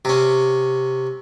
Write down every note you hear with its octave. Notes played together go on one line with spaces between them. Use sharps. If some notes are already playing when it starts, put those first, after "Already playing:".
C3 C#4